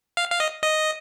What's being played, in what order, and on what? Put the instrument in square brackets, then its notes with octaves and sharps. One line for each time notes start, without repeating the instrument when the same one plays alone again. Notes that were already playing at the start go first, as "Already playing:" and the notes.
[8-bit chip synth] F5
F5
D#5
D#5